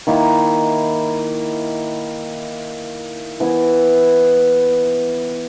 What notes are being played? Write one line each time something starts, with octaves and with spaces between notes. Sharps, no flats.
D#3 A#3 E4
E3 B3 E4